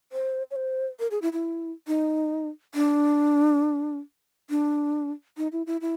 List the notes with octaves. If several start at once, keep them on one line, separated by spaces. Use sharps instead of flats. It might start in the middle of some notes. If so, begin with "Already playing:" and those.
C5
C#5
C5
A#4
G#4
E4
E4
D#4
D4
D4
D#4
E4
E4
E4